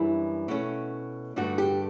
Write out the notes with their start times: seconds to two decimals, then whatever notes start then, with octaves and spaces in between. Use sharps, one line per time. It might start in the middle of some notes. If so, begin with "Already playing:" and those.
Already playing: F#2 E3 G3 D4 E4
0.48 B2 A3 C#4
1.36 G2 D3 A3 D4 F#4
1.58 G4